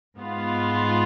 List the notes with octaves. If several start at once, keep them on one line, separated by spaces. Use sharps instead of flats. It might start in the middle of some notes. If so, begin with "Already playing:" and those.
G#2 G#3 B3 F4